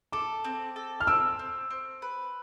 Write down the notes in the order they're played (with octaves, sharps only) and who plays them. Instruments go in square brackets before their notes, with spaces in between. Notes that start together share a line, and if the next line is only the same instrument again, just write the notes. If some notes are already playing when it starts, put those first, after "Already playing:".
[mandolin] A4 [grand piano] D6
[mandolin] C4
A4
[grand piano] F6
[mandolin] C4 [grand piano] E6
[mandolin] C4
C4
B4